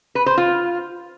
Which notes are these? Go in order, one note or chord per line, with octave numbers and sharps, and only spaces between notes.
B4
C5
F4